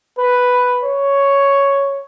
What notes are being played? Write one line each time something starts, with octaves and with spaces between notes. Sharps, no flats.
B4
C#5